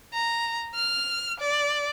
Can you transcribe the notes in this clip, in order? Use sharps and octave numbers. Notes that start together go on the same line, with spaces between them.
A#5
F6
D5